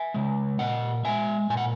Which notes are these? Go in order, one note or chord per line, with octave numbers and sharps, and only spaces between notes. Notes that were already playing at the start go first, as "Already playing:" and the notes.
Already playing: E5 G#5
C#3 G#3
A#2 D#5 F#5
G#3 B3 E5 G#5
A#2 G#5
F#5